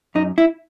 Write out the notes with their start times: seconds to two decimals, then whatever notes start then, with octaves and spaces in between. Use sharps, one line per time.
0.15 F#2 D#4
0.38 E4